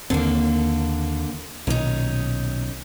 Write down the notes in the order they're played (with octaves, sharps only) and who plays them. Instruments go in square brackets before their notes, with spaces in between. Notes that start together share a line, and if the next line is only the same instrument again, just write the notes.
[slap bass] D#2 C4 [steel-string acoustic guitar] D3 A#3
[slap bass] B1 A#2 D#3 [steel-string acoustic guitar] C#4 D#4